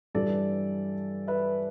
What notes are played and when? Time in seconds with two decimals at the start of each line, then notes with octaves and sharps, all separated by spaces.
0.15 G2 E3 G3 A4 D5
1.28 B4 E5